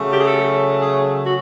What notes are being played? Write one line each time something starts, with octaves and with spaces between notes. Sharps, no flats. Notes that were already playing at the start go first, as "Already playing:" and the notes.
Already playing: C#3 F#3 A3
G4
G#4
A4
G#4
F#4